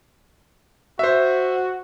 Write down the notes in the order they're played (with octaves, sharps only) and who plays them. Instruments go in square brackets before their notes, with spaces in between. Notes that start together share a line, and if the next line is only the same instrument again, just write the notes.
[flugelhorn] F#4 [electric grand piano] C5 E5